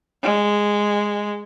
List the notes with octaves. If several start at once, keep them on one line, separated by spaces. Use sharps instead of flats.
G#3